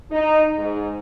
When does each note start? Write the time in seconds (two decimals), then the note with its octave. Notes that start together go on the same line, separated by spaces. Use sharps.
0.12 D#4
0.58 G#2